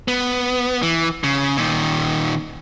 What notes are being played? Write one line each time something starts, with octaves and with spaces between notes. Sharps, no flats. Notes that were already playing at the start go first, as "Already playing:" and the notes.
B3
E3
C#3
A#2 D#3